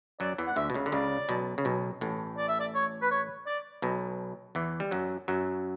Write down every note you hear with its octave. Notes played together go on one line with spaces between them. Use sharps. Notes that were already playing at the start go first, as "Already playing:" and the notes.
F#2 F#3 D5
E2 E3
F#5
D2 D3 E5
B2
C#2 C#3
D3
C#2 C#3 D5
B1 B2
C#3
B1 B2
A1 A2
D5
E5
D5
C#5
B4
C#5
D5
B1 B2
E2 E3
G3
F#2 F#3
F#2 F#3